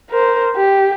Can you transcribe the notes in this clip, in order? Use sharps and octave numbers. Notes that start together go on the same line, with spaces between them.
A#4 C5
G4